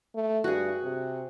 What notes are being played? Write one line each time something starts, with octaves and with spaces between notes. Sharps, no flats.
A3
G2 F#4 G#4
C3